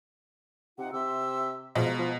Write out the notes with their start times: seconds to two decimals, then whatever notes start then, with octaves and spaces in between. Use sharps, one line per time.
0.78 C3 D#4 F4 F#5
0.93 C3 E5 C6 E6
1.75 B2 F3 G#3 A#5
1.99 F3